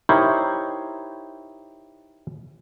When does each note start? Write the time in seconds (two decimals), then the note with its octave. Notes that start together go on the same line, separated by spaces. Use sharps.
0.09 D#4 E4 G4 A#4 C5 C#5